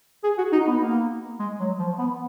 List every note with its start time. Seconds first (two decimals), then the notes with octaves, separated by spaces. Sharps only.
0.24 G#4
0.38 F#4
0.53 D#4
0.67 B3
0.81 A#3
1.40 G#3
1.60 F#3
1.79 F3
1.99 B3